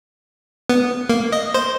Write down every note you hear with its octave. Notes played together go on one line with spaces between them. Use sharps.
B3
A#3
D#5
C5